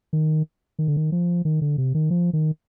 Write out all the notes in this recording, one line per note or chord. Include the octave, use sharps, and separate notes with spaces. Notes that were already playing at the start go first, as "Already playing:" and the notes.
D#3
D#3
D3
D#3
F3
D#3
D3
C3
D#3
F3
D#3